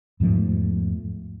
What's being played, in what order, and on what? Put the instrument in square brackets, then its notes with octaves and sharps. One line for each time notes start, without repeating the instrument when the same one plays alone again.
[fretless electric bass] E2 G#2 F3 A3